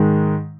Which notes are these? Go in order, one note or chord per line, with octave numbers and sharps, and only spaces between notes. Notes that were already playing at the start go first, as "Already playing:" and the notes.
Already playing: G#2 D#3 G#3